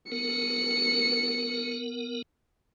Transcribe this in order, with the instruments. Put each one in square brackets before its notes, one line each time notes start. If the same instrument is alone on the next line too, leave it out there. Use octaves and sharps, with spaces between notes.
[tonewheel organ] B3 A#4 [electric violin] C#7